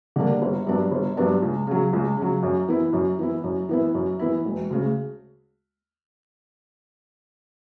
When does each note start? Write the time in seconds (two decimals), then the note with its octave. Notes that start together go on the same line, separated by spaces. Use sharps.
0.16 D3 G3 A#3 D4
0.42 G1
0.66 G2 F#3 B3 D4
0.91 G1
1.17 G2 F#3 B3 D4
1.42 C#2
1.67 C#3 F#3
1.93 C#2
2.17 C#3 F#3
2.43 F#2
2.68 E3 B3 E4
2.93 F#2
3.19 E3 B3 E4
3.44 F#2
3.69 E3 B3 E4
3.94 F#2
4.19 E3 B3 E4
4.45 E1
4.70 D2 C#3